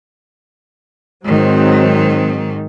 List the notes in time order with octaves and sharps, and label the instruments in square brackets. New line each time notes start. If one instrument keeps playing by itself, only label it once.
[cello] G#2 D#3 [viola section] F#3 C4